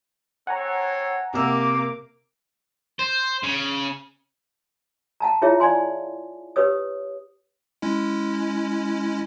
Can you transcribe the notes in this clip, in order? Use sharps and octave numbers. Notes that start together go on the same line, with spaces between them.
C4 A4 C#5 F#5 G#5 A#5
C3 A#3 D6 E6
C5
C#3
F#5 A5 A#5
E4 F4 G#4 C#5 E5
D5 F5 G#5 C6
G4 B4 C#5 D#6
G#3 C#4 E4